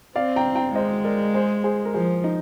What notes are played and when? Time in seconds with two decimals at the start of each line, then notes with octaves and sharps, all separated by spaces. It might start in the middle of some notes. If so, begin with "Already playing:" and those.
0.16 C4 D5 F5
0.36 G5 A#5
0.55 G5 A#5
0.75 G#3 C5 D#5
1.04 A#4 D5
1.34 G#4 C5
1.64 G#4 C5
1.85 A#4
1.94 F3 G#4 C5
2.24 D#4